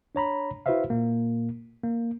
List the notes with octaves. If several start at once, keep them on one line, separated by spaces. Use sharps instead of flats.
D4 C#5 A#5 B5
E4 F#4 B4 C5 E5 F5
A#2 A#3
A#3